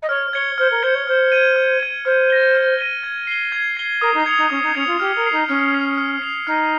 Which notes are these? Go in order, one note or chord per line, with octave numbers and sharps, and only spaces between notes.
D#5
C#5 F6
C#5 G#6 C#7 G7
C5 F6
A#4
C5 G#6 C#7 G7
C#5
C5 F6
G#6 D#7
F6
G#6 D#7
C5 F6
A#6 D#7 G7
F6
A#6 D#7 G7
G#6
C7 G7
G#6
C7 G7
A#4 D#6
D#4
G#6 C#7 F7
D#4
C#4 D#6
D#4
C#4 G#6 C#7 F7
F4
G4 F6
A#4
C7 F7
D#4
C#4 F6
C7 F7
F6
C7 F7
D#4 F6